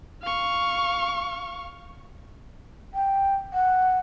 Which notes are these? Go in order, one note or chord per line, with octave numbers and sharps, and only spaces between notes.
F5 C#6
G5
F#5